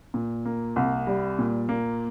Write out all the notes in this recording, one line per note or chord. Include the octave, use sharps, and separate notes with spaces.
A#2
A#3
C2
G3
A#2
A#3